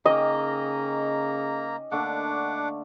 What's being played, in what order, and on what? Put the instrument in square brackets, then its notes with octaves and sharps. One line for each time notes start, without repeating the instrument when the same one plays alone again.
[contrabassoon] C#3 [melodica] A#3 A#5 [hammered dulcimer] C#4 D#4 G4 [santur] D#5
[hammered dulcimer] D3 A3 A#3 [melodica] D4 F#5 D6